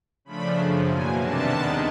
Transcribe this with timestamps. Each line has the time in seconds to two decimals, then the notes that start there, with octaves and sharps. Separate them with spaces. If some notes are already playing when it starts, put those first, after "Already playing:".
0.25 C#3 F3 A3 D4 B5
0.56 F#2 C#3 F3
0.87 E2 B2 F#3 A#3 G#5
1.18 C3 D#3 G3 B3 D4 A5
1.49 D#2 D#3 G#3 B3